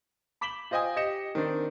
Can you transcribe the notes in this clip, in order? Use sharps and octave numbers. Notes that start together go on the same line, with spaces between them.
B5 D6 B6 E7 F#7 G7
F4 C5 D#5 G5 G#5 D#6
G4 D#5 C#7 E7
D#3 C4 D4